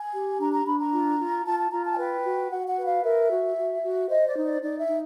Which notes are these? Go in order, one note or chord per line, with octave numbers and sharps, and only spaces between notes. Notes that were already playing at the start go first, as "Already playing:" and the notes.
Already playing: G#5
G4
D4 A#5
A#5
D4 B5
A#5
F4
F4
F4 A5
A5
F4 A#5
A5
G#5
B4 G5
F#4
F#4 F#5
F#5
B4
F5
A#4 E5
F#4
F#4
F#4
C5 D#5
D5
D#4
D5
D#4 D5
E5
D#4